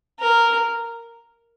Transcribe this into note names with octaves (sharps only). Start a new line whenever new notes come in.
A#4